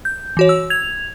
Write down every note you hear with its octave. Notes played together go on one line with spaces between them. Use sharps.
G6
E3 F#4 C#5
E6
G#6 F7